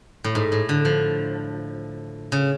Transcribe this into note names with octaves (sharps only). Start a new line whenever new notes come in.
A2
G#2
A2
D3
F3
C#3